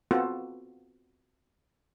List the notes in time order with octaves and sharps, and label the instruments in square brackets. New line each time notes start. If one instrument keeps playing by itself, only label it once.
[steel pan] B3 C4 F4 F#4 A4